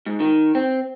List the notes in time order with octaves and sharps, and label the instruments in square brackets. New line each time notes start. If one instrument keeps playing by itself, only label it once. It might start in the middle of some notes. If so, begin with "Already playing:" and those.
[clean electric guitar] G#2
D#3
C4